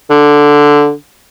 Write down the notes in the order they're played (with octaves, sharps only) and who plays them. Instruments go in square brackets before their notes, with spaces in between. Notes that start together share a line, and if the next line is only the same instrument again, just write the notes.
[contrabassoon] D3